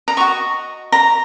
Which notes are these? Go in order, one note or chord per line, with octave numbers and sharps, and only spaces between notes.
A#5
F#4 D#5 C#6
A#5